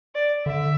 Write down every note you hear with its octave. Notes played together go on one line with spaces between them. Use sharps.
D5
D3 E5